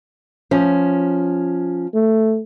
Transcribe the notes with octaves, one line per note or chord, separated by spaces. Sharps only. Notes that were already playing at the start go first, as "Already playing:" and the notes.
F3 C#4
A3